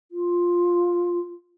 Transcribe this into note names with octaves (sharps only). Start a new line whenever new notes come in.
F4